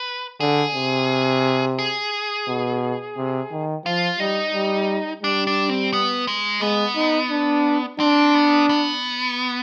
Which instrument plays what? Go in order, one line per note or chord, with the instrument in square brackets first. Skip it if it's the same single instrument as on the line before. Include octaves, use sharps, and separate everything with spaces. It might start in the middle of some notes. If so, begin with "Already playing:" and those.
Already playing: [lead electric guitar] B4
[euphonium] D3 [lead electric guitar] G#4
[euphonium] C3
[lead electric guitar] G#4
[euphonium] B2
C3
D#3
[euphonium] F3 [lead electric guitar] F4
[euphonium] G3 [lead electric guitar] D#4
[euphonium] G3
[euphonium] G3 [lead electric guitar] D4
[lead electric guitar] D4
C4
B3
G#3
[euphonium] G#3 [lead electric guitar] B3
[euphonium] D#4
D4
[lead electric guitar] C4 [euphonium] D4
[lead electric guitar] B3
B3